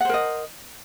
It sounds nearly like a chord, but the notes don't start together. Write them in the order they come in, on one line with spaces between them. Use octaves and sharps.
F#5 C5 A#4 D#5